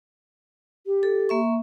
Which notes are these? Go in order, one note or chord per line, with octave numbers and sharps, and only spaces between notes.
G4
A4
A#3 E5 C#6